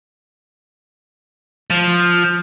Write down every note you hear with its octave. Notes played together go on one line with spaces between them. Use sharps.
F3